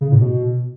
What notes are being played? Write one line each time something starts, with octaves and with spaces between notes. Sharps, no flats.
C#3
A2
B2